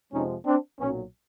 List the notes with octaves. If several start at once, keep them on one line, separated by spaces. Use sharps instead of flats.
F2 C3 F3 G#3 C#4 D#4
C4 D4
B1 A#2 F#3 B3 C#4